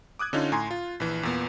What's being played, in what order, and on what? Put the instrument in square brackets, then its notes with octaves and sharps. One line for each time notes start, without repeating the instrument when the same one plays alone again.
[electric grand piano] D6 D#6 F#6 G#6
D3 C#4 D#4 F4
A2 G#5 A#5 C6
F4
A#1 E3
E2 A#2 B3